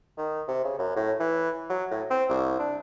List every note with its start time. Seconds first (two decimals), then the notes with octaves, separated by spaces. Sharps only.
0.18 D#3
0.48 C3
0.64 C#3
0.79 F#2
0.96 A2
1.20 E3
1.70 F#3
1.91 A2
2.11 C4
2.29 C2
2.59 D4